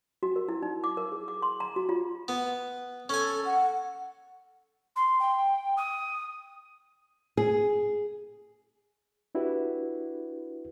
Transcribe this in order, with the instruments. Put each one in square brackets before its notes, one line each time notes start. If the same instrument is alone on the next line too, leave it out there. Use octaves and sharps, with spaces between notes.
[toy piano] F#4
A#4
E4
D#4
D6
A#4
G#4
D6
C6
A#5
F#4
F4
[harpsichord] B3
[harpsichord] C#4 G#5 [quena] A4
[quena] F#5
[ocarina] C6
G5
D#6
[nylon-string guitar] G#4
[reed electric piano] D4 E4 F#4 G4 B4